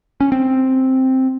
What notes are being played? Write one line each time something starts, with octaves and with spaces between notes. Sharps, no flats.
C#4
C4